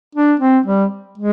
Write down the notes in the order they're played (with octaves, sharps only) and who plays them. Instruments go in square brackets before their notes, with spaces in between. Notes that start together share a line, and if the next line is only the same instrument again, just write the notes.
[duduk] D4
C4
G3
G#3